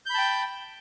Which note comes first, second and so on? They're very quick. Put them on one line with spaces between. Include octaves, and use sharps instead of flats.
G6 B5 A5 G5